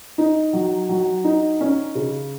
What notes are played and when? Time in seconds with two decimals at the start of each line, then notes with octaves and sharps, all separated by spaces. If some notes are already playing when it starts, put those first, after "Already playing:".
0.18 D#4
0.53 F#3
0.89 F#3
1.24 D#4
1.61 C#4
1.95 C#3